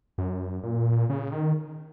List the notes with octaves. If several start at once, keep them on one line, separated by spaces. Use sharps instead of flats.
F#2
A#2
C#3
D#3